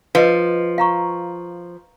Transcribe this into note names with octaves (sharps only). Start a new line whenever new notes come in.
F3 B4 D#5
F5 A#5 C#6